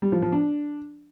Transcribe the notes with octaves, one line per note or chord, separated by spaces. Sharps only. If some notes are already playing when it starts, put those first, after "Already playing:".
G3
F3
F3
D4